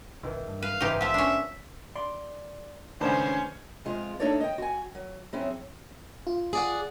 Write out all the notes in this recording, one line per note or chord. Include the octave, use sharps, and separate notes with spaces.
G#1 C#2 D#3 E3
G2
B4 F5
F#1 G#2 C#3 E3 D#4 G4 A#4
A#1 F3 B3 E5
C#4 D4
D5 C6
C#2 A2 D#3 C#4 D4 B4 C5
F2 G#3 F4
A3 D4 D#4 A4 C#5 D5
D#5 G5
F#4 G#5
F#3
F#3 C4 C#4 E4 G#4
F4
G#4 D5 F#5